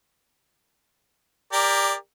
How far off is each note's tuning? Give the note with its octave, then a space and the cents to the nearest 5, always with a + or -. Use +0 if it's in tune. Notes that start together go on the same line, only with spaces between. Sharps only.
G4 +20 A#4 +0 D5 +0